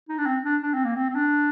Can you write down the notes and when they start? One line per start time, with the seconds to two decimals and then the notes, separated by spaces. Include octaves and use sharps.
0.09 D#4
0.18 D4
0.26 C4
0.44 D4
0.62 D4
0.74 C4
0.85 A#3
0.96 C4
1.09 C4
1.15 D4